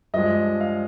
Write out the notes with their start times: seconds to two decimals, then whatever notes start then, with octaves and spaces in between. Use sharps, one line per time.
0.14 G2 F3 G#3 D#5
0.61 F5